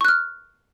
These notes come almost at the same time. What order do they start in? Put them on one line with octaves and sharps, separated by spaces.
C#6 F#6 F6